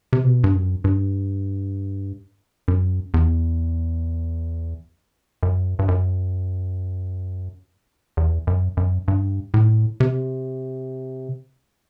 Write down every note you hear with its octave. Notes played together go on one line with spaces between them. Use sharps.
C3
B2
G2
F#2
G2
F#2
E2
F#2
G2
F#2
E2
F#2
F#2
G2
A2
C3